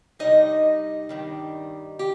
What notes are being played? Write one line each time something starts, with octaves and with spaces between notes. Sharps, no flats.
C3 G3 D#4 D#5
G2 D#3 G3
G4